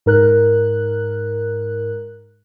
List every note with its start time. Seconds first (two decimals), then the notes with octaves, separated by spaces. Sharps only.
0.06 G#2 A#4 F#6